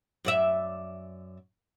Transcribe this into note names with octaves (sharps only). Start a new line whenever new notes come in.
F#2 D5 E5